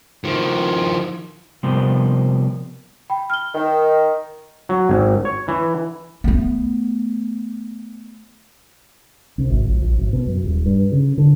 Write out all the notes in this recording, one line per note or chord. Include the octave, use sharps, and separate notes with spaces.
D#3 F3
C3 F3 G3 A#3 B3 C5
G5 B5
F6 G7
D#3
F#3
G#1
C#5
E3
A3 B3
C2
G#1
A#1
A#1
G#1
B2
F#2
D#1
G2
C#3
D3